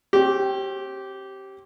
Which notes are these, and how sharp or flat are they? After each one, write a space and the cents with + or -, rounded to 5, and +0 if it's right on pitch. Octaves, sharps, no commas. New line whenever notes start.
C4 +45 G4 -15